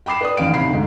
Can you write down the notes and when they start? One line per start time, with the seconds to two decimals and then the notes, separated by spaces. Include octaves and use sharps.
0.06 G5 B5 D6 C7 E7
0.21 B4 D5 D#6
0.37 A1 D#2 C#4 F5 D7
0.54 C3 B5 C7
0.69 D2 G#2